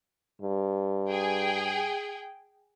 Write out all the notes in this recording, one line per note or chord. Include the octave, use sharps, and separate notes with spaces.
G2
G#4 G5